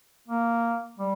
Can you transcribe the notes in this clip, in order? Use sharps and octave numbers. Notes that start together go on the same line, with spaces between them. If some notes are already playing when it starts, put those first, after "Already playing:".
A#3
G3